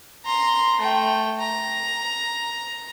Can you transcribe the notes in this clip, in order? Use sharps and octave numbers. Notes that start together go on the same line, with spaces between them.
A#5 C6
A3 G5
A#5